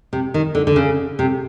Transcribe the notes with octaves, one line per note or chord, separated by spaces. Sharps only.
C3
D#3
D3
D3
C#3
C3